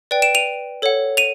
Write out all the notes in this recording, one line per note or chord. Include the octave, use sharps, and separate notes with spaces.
B4 D5 G5
D7 E7
D#7 F7
A4 C#5 F#5
D#7 F7